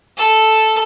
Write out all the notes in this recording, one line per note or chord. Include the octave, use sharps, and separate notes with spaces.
A4